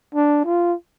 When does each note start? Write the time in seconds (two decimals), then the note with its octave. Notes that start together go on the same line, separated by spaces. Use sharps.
0.15 D4
0.45 F4